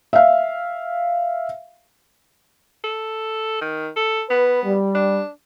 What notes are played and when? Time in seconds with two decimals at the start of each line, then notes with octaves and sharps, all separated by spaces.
0.13 E5 F5
2.84 A4
3.61 D#3
3.96 A4
4.30 B3 B4
4.64 G3
4.95 D4